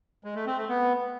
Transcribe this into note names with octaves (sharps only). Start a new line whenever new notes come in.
G#3
A3
C4
A3
B3